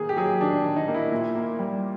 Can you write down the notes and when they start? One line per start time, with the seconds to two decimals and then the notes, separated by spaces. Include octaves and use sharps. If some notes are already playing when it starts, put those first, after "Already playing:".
Already playing: D#3 A#3 G#4
0.09 G4
0.17 F#3 G#4
0.41 D#3 D4
0.64 D#3
0.76 D#4
0.88 A#3
0.94 E4
1.12 A#2
1.35 A#3
1.59 G3